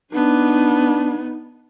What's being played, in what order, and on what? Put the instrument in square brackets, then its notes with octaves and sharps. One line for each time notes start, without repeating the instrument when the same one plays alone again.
[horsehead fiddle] B3 D#4 [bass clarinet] D4